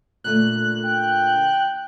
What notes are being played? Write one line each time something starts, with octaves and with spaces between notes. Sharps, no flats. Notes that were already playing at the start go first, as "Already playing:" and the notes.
A#2 D3 A3 F#6
G5